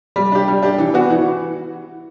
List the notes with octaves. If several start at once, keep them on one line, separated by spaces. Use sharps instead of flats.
G3
D4 G4
G3
D4 G4
E3
B3 F#4
E3